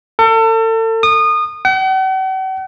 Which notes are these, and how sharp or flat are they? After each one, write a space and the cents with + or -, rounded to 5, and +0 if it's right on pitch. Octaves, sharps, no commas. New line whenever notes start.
A4 +35
D#6 -25
F#5 +45